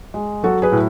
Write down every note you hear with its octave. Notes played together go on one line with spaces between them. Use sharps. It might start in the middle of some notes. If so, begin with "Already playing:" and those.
G#3
F#3 F#4 A4
G#4 B4
A2